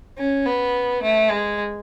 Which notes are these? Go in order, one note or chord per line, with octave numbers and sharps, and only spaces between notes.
C#4
B3
A3
G#3